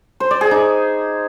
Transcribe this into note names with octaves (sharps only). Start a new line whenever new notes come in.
C5
D5
G#4
D#4